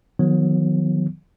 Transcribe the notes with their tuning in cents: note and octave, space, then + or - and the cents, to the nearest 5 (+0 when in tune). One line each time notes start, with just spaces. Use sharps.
D#3 +0 F#3 -40 B3 +0